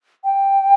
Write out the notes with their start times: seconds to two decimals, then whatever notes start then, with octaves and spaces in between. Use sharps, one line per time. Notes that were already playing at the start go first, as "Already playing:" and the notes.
0.24 G5